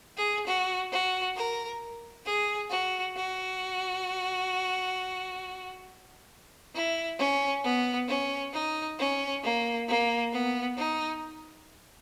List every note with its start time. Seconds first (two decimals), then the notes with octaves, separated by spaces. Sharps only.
0.17 G#4
0.47 F#4
0.92 F#4
1.36 A#4
2.26 G#4
2.70 F#4
3.16 F#4
6.75 E4
7.18 C#4
7.64 B3
8.08 C#4
8.53 D#4
8.99 C#4
9.43 A#3
9.88 A#3
10.32 B3
10.77 D#4